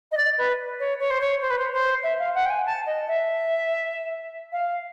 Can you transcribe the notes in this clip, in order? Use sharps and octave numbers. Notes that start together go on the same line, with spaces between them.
D#5
D5
B4
C#5
C#5
C5
C#5
C5
B4
C5
C5
E5
F5
F#5
G5
G#5
A5
D#5
E5
F5